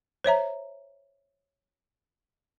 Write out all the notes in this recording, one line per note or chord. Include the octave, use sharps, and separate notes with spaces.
C5 C#5 E5 A#5